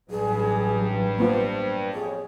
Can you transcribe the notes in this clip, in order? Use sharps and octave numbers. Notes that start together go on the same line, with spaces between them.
A1 G2 F#3 G#4
A#3 B3 F4 C5
F2 G3 G#4 C#5